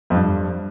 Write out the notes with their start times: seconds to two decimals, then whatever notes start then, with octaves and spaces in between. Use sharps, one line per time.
0.10 F2
0.14 G2